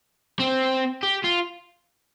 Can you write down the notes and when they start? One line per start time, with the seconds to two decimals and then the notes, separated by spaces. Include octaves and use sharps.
0.40 C4
1.03 G4
1.24 F4